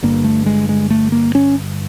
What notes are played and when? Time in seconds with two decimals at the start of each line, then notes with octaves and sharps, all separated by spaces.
0.02 G1 G2 D3 A#3
0.24 A3
0.46 G#3
0.69 G#3
0.90 A3
1.12 A#3
1.35 C#4